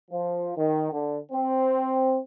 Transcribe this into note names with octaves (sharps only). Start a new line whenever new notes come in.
F3
D#3
D3
C4